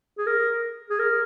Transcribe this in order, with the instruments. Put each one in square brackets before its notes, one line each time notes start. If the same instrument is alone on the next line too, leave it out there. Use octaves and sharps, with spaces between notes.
[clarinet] G#4
A#4
G#4
A#4